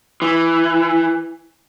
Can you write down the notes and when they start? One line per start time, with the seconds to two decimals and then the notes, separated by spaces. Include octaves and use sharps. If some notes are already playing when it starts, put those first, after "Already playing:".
0.22 E3